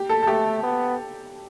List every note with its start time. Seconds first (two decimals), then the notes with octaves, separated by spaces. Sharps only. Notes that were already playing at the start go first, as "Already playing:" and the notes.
Already playing: G4
0.09 A4
0.23 A4
0.27 A3 G4
0.63 B3